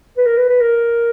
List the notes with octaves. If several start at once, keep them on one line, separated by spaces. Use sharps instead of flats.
B4
A#4
B4
B4
A#4